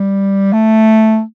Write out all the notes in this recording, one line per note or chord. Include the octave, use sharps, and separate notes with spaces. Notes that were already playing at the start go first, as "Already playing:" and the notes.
Already playing: G3
A3